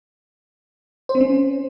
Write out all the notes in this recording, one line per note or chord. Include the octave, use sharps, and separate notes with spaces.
C5
C4
C#4